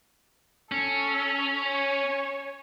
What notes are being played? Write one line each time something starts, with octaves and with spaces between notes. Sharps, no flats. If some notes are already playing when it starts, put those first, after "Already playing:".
C#4 A4
C#5